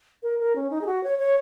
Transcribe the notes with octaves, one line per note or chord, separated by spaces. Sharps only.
A#4
A#4
C#4
D#4
G#4
F#4
C#5
C#5